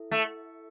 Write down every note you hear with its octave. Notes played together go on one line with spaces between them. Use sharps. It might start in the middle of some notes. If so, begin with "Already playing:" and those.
Already playing: E4 A4 E5
A3